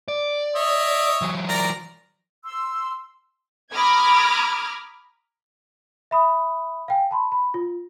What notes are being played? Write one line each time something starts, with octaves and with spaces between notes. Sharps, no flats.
D5
C#5 D#5 E5
E3 F#3
A#4 D5 A#5
C6 E6
A#5 B5 D6 D#6 F6 G#6
E5 B5 D#6
F5 G5 G#5
A5 B5 C6
B5
F4